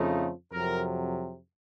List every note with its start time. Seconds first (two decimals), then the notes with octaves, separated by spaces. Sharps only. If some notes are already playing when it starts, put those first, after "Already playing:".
Already playing: F2 C#3 F3 A3 D#4
0.52 F2 C3 F#3 A#4